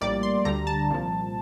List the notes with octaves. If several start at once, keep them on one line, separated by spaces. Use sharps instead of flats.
A#1 A2 G3 A#3 D5
C6
D2 D3 G3 A#5
A5
C2 A#2 F3